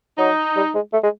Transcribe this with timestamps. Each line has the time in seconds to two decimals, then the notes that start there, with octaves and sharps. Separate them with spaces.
0.18 F#3 D#4
0.56 G3
0.75 G#3
0.93 A3
1.03 G#3